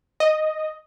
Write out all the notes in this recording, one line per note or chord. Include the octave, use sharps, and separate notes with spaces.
D#5